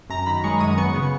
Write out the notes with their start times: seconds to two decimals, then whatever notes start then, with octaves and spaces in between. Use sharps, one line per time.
0.09 F#2 A#5
0.26 D#3 B5
0.44 G#3 C#6
0.60 F#2 D#6
0.78 B3 C#6
0.94 C#3